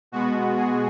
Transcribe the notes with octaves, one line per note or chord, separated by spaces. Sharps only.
B2 G#3 B3 F#4
G#4